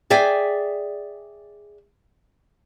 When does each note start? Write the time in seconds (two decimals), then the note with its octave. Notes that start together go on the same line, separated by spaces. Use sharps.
0.10 G#4 D5 E5 G5 G#5